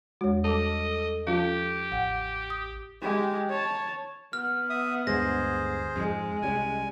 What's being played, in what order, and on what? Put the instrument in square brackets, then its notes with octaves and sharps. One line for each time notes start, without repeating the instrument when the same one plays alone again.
[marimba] E2 G#3 [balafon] F#4 C#5
[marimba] G3 D6 [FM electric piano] A4 [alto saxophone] D#5
[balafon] F3 C#4 F4 [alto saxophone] G4 [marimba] F5 A5
[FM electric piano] A1 [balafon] F#5 G5
[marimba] D#6
[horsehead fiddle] G#3 G4
C#5 A5
[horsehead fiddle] B3 [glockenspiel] F6
[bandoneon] E5 D#6
[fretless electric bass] D2 G2 G#3 [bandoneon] G#4 C5 [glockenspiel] A#6
[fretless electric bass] F2 G#2 [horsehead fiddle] G#3
[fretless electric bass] C2 G3 C#4 [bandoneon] G#5